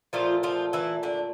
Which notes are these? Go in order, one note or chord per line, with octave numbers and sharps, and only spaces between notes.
A#2 F3 A3 F4
F3 F4
E3 E4
D3 D4